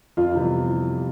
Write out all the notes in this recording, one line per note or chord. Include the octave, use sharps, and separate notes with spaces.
F2 F4
C3 E3 G3 B3